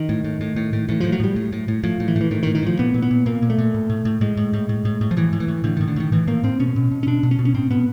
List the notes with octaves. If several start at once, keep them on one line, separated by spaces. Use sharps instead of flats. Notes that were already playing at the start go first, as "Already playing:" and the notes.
Already playing: D#3
A2
A2
A2
A2
A2
A2 E3
A2 F3
F#3
A2 G3
A2
A2
A2
A2 F3
A2
E3
A2
E3
A2 D#3
D#3
A2
D#3
A2 F3
A#2 B3
A#2
B3
A#2
A#2 A#3
A#2
A3
A#2
A2
A2
A2
A2 G#3
A2
A2
A2
A2
A2
F3
A2 E3
A2
E3
A2
A2 D3
A2 D#3
D3
A2 D#3
A2 E3
A2 A#3
A2 C4
B2 C#4
B2
B2
C#4
B2 D4
B2
C#4
B2
C#4
A2 C4
A2 B3